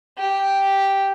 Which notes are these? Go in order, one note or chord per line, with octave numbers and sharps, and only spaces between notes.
G4